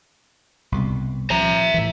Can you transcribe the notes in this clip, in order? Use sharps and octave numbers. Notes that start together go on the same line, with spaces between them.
C2 B2
F3 E5 A#5
A2 E3